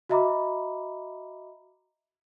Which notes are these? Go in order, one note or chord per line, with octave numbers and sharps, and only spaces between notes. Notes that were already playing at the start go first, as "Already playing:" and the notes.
F#4 D#5 E5 A#5 B5 D6